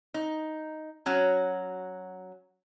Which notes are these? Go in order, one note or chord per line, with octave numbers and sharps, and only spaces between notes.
D#4
F#3 C#4 F#4